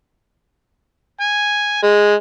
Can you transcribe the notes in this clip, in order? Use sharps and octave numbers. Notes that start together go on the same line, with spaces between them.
G#5
G#3